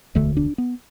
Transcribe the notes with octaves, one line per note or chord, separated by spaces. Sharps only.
E1 D2 D3 A3
D4
B3